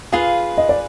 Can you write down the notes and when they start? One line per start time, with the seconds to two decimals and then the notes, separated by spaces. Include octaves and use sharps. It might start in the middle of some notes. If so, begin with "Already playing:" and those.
0.12 F4 G#4 B4 F5
0.58 D#5
0.69 D5